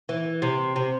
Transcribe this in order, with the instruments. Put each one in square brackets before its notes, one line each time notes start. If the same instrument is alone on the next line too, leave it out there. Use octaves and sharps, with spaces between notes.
[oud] E3
C3
C3